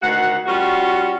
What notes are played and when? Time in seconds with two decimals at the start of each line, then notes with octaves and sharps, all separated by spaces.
0.02 D2 D#3 F#4 F#5
0.46 G3 C#4 F4 F#4